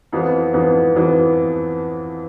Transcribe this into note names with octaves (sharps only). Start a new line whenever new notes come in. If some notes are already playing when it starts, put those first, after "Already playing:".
F2 E3 B3
F2 E3 B3
F2 E3 B3